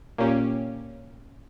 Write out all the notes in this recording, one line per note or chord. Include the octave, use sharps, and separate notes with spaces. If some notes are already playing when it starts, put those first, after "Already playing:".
A#2 A#3 C#4 G4